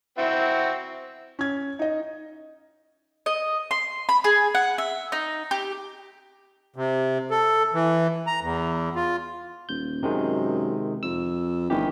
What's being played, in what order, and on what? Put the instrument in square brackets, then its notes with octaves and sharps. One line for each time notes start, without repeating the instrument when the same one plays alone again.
[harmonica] C4 E4 F#4
[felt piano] C#4 G#6
D#4 D#5
[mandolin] D#5
C6
B5
G#4
F#5
E5
D#4
G4
[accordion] C3
A4
E3
A#5
E2
F4
[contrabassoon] D#1 [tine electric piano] G6
[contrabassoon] F#2 [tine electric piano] C3 D#3 G#3
[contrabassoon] F2 [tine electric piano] E6
[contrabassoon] G1 [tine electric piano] D#3 E3 G4